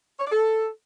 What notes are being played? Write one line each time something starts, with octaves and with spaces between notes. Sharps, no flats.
C#5
D5
A4